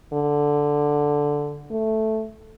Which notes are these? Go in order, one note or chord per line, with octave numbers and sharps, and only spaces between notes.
D3
A3